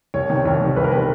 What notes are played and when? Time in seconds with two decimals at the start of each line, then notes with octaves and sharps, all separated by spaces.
0.14 C2 C#5
0.30 C3 D#3
0.45 C2 C#5
0.61 C3 D#3
0.76 C2 B4
0.84 A#4
0.91 C3 D#3 B4